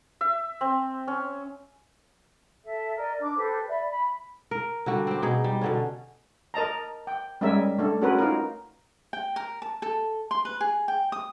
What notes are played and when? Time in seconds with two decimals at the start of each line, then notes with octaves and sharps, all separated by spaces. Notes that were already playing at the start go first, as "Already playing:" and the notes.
0.21 E5
0.61 C4
1.08 C#4
2.64 A4 E5
2.97 A#4 D5 D#5
3.19 D4 D6
3.37 G4 A4 B4 C5
3.68 D5 E5 B5
3.87 B5
4.51 A#4
4.86 D3 G3 F#4
5.07 C4 G4
5.22 B2 D#4 G#4
5.44 G3
5.61 B2 D3 C#4
6.54 A#4 D#5 A5 A#5
7.07 G5
7.41 G3 G#3 C#4 G#4 A#4 E5
7.78 A3 D4 A4
8.02 C#4 F#4 G#4 A#4 B4
8.19 D#4 F4 A#4
9.13 G5
9.36 A#4
9.62 A5
9.82 A4
10.31 C6
10.45 B4
10.61 G#4
10.88 G5
11.12 D#6